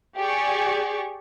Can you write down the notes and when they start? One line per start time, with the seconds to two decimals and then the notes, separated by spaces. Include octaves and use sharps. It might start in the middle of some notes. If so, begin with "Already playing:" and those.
0.19 G4 G#4 D5 C#6